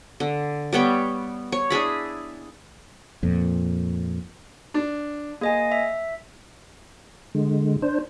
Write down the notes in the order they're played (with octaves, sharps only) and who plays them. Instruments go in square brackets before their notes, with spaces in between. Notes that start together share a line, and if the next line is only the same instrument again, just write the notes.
[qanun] D3
G3 B3 C#5 G5
C#5
D4 E4 G#4 B5
[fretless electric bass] F2 A#2
[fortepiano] D4
[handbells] A#3 D#5 G#5 [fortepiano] G#4
[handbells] E5
[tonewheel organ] D3 G#3
D4 C5